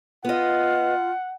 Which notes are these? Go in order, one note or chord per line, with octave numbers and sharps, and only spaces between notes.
B3 F4 D#5 F#5